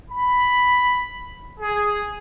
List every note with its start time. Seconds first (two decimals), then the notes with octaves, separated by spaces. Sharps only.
0.10 B5
1.60 G#4